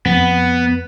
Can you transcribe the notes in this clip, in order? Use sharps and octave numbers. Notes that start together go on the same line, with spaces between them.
F2 B3